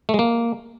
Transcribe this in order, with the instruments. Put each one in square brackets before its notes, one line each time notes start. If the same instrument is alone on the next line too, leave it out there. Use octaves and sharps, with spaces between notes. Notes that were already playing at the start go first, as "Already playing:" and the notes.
[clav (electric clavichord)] A3
G#3
A#3